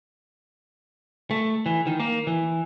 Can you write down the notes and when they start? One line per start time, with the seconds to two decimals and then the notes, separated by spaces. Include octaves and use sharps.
1.31 A3
1.66 E3
1.87 D#3
2.00 A#3
2.27 E3